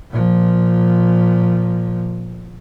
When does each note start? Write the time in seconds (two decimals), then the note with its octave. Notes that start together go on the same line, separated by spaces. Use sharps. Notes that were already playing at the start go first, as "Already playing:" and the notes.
0.11 A#2 F3